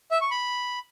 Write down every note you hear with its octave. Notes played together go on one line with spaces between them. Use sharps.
E5
C#6
B5